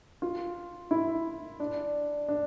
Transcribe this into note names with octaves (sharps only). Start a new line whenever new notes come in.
F4
E4
D4
D4